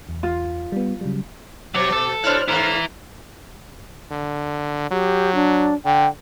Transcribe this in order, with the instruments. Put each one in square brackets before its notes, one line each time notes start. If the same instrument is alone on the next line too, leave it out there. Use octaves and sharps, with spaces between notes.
[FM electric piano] E2
[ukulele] F4
[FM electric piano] G3 B3
C#3 F#3 G3
[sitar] B2 [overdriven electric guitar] F#3 C#5 [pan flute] D6
[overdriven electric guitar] A4
[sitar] B2 D4 E4 [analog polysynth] C5 F6 F#6 [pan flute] C#5
[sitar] G#2 A#3 [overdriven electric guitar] E4 B4 [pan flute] A#5
[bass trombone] D3
[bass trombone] F#3 [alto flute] G4
[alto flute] D4
[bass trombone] D3 [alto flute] G5